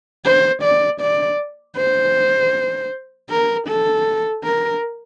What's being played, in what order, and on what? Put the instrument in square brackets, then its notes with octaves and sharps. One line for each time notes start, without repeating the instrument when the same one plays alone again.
[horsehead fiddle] C5
D5
D5
C5
A#4
A4
A#4